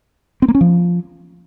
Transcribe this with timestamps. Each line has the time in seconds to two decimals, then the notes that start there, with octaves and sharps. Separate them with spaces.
0.42 C4
0.48 A#3
0.55 C#4
0.61 F3